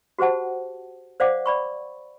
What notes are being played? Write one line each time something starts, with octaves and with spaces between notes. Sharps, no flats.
F#4 G4 C5 F#5 A5
C5 D5 F5 F#5 D6
D5 B5 C#6